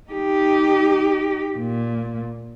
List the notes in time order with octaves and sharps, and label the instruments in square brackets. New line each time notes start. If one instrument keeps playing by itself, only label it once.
[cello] D#4 G4
A#2